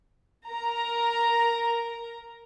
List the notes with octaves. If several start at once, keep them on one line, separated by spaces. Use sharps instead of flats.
A#4 A#5